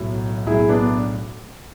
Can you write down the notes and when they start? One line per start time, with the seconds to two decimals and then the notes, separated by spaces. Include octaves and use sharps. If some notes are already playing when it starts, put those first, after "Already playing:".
Already playing: B1 A2 F#3
0.46 B1 A2 F#3 E4 G#4
0.69 B3 D4